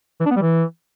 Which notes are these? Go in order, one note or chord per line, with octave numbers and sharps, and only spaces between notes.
E3
D4
B3
G3
E3